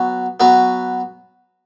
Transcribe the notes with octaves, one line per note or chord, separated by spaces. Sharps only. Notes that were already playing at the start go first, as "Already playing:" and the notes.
Already playing: F#3 B3 F#4
F#3 B3 F#4 B4